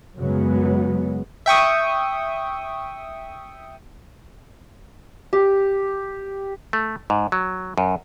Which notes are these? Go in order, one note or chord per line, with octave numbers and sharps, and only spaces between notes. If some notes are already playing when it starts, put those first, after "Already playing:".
F#2 C#3 F#3 G#3 B3
E5 G5 C#6 D#6
G4
A3
G#2
F#3
F#2